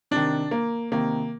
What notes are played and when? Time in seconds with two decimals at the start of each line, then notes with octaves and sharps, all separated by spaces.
0.11 C3 D#3 D4
0.51 A#3
0.92 C3 D#3 A#3